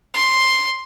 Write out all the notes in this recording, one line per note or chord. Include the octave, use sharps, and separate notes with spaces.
C6